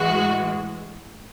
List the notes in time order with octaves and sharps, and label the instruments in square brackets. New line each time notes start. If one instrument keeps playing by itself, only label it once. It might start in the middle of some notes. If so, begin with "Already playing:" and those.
Already playing: [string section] A2 E3 G#3 F#4